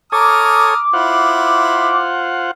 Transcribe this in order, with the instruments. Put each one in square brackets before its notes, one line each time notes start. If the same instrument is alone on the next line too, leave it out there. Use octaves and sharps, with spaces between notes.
[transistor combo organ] A4 C#5 G#5 [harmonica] A#5 D#6 F6 [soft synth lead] D6
[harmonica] E4 [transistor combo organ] F4 C5 F#5